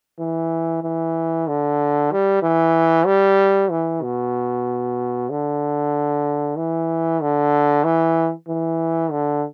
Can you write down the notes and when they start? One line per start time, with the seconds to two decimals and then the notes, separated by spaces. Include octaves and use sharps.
0.20 E3
0.83 E3
1.48 D3
2.12 G3
2.42 E3
3.06 G3
3.70 E3
4.02 B2
5.30 D3
6.57 E3
7.21 D3
7.84 E3
8.49 E3
9.11 D3